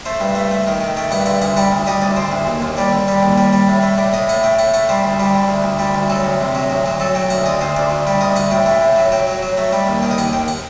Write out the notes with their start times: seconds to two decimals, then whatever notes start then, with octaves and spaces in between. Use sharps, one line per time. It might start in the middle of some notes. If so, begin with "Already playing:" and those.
0.06 A3 C5
0.20 G2
0.35 A3
0.51 A3
0.67 D#3
0.81 D#3
0.97 A3 G5
1.11 G2 F#5
1.26 D3 F#5
1.42 D2 F#5
1.56 G3 F#5
1.72 D2
1.87 G3 D#5
2.01 D2 D5
2.17 D3 C5
2.32 D2
2.47 D#2
2.62 D#2
2.77 G3 D5
2.92 D3
3.08 G3
3.23 D#2
3.38 G3
3.53 G3
3.68 A2
3.83 A3
3.98 A2 D5
4.13 A2 D#5
4.28 A2 F#5
4.43 A3 G5
4.59 A2 F#5
4.74 A3 F#5
4.89 G3 C5
5.04 D2
5.20 G3
5.34 D3
5.49 D2
5.64 D2
5.79 G3
5.95 D2
6.10 F#3 A4
6.25 D2
6.41 C3
6.55 F#3
6.70 D2
6.86 F#3
7.00 F#3 A4
7.15 F#3 G5
7.30 D2 F#5
7.46 D3 D#5
7.61 D2 C5
7.77 D2 D5
7.91 D2
8.07 G3
8.21 D2 D#5
8.36 D2 F#5
8.51 A2 G5
8.66 A3
8.81 A2
8.96 F#3
9.12 F#3 G5
9.27 F#3
9.43 F#3
9.57 A3
9.73 G3
9.87 D#2
10.02 D#3 G5
10.11 D#5
10.18 D#2 F#5
10.33 D#2 G5
10.48 F#5